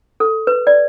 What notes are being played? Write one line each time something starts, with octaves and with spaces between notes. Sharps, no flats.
A4
B4
D5